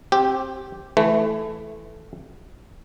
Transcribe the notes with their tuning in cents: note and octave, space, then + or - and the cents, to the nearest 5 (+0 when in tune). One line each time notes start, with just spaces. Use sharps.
C4 +20 G4 -5
E3 +0 A3 -10 B4 +35